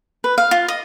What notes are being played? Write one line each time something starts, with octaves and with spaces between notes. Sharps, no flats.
B4
F5
F4
D#5